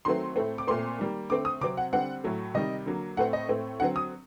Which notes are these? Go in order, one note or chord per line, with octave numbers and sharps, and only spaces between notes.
D#3 F#3 A3 C4 C6
A2 A3 C4
D6
A#2 A3 C4 C6
D#3 G3 A#3
D3 A3 C4 D6
D#6
C3 F#3 C4 D6
F#5
D3 G3 C4 F#5
A2 F#3 A3
C3 D#3 G3 D#5
D3 F#3 A#3
A2 A3 C4 F#5
D#5
A2 A3 C4
D3 F#3 C4 F#5
D#6